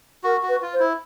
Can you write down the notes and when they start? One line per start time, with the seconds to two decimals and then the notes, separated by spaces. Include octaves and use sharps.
0.24 F#4 A#4
0.43 F#4
0.49 B4
0.62 F4
0.73 C5
0.80 E4